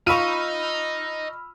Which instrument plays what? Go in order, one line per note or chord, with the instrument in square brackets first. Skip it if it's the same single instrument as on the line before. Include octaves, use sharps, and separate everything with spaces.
[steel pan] F4 [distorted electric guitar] D#5 A#5 [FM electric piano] B5 E6 F6 [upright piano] C#6 D#7